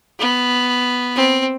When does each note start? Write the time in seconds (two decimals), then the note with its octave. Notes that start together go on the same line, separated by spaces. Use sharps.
0.19 B3
1.16 C4